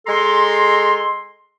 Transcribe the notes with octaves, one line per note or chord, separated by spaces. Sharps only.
G#3 A4 A#5 C6